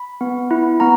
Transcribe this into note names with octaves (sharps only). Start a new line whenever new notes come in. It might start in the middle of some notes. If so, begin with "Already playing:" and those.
Already playing: B5
B3
E4
B3 A#5